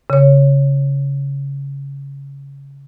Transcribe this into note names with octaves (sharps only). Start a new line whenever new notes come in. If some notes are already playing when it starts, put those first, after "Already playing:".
C#3 C#5